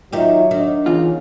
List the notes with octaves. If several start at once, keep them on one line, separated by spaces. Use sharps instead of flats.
D#3 F#3 D#4 F4 G4 E5
D#3 D4
E2 C#3 F4